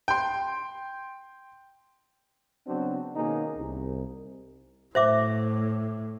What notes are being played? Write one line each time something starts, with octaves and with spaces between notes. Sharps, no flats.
G5 C6
C#3 F#3 B3 C4 D4 F#4
B2 D#3 A#3 C#4 D#4 G#4
C2
A2 C5 E5 D6